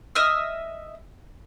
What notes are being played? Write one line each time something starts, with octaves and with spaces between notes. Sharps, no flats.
D#5 E5 F6